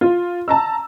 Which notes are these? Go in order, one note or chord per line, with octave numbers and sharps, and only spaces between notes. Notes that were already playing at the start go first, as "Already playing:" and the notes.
F4
A5 A#5 E6